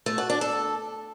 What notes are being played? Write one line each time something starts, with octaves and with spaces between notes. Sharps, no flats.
A3
F#4
D4
A4